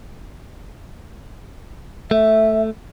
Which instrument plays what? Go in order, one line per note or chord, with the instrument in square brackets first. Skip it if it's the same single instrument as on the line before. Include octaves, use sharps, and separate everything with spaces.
[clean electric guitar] A3 [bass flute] E5